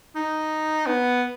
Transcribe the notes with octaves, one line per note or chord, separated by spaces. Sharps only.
D#4
B3